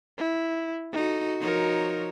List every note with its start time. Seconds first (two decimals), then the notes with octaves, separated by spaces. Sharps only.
0.18 E4
0.93 D#4 F#4 A4
1.41 F3 D#4 F#4 A#4 C#5